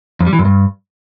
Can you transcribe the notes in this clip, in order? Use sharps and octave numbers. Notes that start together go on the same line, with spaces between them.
F2
G3
E3
F#2
G2